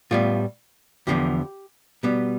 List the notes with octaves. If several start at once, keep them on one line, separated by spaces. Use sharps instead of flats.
A2 G3 B3 F4
E2 D3 F3 B3 G4
B2 G3 B3